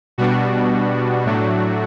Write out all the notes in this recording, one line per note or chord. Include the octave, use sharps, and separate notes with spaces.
B2 G3 B3 D4 F#4
A2 F#3 A3 D4